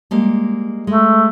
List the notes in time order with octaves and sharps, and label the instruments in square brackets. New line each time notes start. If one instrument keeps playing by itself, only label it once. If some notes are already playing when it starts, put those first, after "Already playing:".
[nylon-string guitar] G3 G#3 A#3
[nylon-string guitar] G#3 [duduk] A3